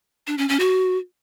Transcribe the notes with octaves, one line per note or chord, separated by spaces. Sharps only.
D4
C#4
C#4
F#4